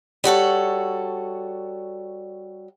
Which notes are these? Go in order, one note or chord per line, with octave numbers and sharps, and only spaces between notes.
G3 F#4 A4 C#5